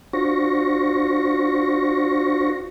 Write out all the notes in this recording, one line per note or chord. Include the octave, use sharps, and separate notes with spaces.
D4 F4 F#4 C5 C#6 A#6